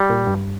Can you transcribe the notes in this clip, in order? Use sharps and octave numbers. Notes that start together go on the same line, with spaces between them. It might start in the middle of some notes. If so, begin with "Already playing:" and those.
Already playing: G3
A#2
G2